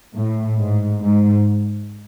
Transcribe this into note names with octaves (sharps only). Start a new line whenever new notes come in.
A2
G#2
G#2